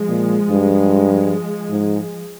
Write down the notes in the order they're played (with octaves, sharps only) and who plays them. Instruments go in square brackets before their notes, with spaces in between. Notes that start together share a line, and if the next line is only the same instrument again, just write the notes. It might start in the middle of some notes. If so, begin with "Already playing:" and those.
Already playing: [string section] F3 G#3
[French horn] A#2
G2
G#2